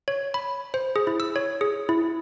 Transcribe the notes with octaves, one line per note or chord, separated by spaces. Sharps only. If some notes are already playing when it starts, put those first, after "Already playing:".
C#5
B5
C5
G#4
E4
E6
C#5
G#4
E4